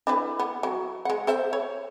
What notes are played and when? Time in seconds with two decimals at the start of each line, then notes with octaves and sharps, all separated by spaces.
0.07 D4 E4 B4
0.39 B3
0.63 F#3
1.05 G#3 F#5
1.27 A4 C5 E5
1.53 C#5